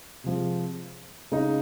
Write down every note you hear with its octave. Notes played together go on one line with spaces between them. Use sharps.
C3 F3 G#3
C#3 G#3 D#4